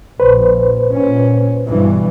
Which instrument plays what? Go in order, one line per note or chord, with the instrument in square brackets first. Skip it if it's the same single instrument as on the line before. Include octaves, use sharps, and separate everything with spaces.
[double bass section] A#1 [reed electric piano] B4 C5
[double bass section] A#2 C#4
G2 B2 E3